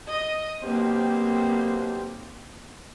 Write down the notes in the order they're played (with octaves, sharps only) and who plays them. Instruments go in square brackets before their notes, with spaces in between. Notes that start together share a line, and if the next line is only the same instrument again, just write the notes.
[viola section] D#5
[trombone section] B1 G4 C5 [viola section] A#3 C4